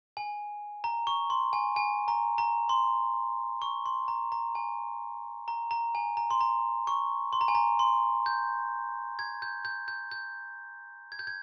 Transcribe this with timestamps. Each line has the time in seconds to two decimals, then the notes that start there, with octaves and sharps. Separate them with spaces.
0.17 G#5
0.84 A#5
1.07 C#6
1.30 C6
1.53 G#5
1.76 G#5
2.08 A#5
2.38 A#5
2.69 C6
3.62 C#6
3.86 C6
4.08 A#5
4.32 A#5
4.55 G#5
5.48 A#5
5.71 A#5
5.95 G#5
6.17 A#5
6.31 C6
6.41 A#5
6.87 C#6
7.33 C6
7.41 A#5
7.48 G#5
7.55 A#5
7.79 C6
8.26 G6
9.19 G#6
9.42 G6
9.65 G6
9.88 G6
10.11 G6
11.12 G#6
11.19 G6
11.27 G#6